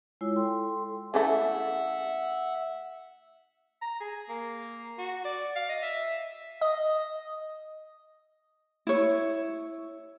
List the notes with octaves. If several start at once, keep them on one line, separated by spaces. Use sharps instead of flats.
G#3 E4 F4 C#5 E6
A4 G5 C6
C#3 E3 A3 E5 F#5
A#5
G#4
A#3
F#4
D5
F5
D#5
E5
D#5
E4 C#5